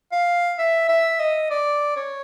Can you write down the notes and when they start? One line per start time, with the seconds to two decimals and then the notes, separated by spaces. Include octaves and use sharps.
0.12 F5
0.59 E5
0.89 E5
1.20 D#5
1.50 D5
1.96 C#5